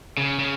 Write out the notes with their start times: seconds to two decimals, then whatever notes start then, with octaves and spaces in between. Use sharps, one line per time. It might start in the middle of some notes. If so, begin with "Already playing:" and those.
0.17 C#3
0.39 C#3